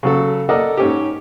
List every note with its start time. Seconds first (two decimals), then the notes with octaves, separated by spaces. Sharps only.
0.03 C#3 F#3 F#4 A4
0.49 A4 A#4 D5 D#5 F#5
0.77 G#2 C#4 G4